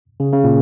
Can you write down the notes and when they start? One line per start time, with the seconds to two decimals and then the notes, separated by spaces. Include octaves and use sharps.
0.20 C#3
0.33 C#3
0.44 A#2